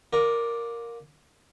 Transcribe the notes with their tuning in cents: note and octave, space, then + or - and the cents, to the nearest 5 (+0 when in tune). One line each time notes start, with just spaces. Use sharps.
F4 +35 A#4 +0 D5 +0